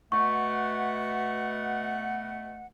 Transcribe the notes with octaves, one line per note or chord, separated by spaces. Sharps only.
B2 A3 F#5 C#6